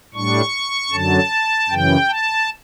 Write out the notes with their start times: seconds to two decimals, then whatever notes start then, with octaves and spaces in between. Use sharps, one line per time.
0.14 A2 G3 D4 C#6
0.91 F#2 D3 F#3 A5
1.69 F#2 C#3 E3 G5
2.09 A5